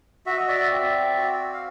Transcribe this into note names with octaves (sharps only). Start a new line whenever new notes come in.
F#4 E5
D#5
D5 E5
C4
F#4
F5